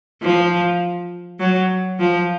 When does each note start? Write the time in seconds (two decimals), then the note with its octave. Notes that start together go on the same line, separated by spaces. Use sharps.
0.22 F3
1.40 F#3
2.00 F3